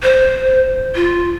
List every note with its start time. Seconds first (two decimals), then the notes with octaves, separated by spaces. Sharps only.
0.03 C5
0.95 F4